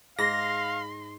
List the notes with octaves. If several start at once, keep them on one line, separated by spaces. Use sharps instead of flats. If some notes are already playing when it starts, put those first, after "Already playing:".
G#2 F5 C6 A#6